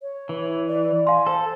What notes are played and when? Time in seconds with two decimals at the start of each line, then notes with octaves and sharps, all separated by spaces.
0.02 C#5
0.29 E3
0.67 D5
1.07 F5 G#5 C6
1.27 A4 C5